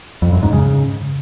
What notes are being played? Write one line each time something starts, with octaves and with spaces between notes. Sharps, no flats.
F2
F#2
G#2
C#3